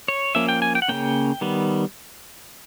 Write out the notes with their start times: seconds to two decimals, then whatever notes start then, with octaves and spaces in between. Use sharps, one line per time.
0.08 C#5
0.35 F3 A#3 C#4 E5
0.49 G5
0.62 G#5
0.75 G5
0.82 F#5
0.88 C#3 F3 A#3 C#4 G5
1.41 D#3 G3 B3